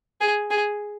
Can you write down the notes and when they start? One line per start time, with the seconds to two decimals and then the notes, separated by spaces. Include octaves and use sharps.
0.21 G#4
0.50 G#4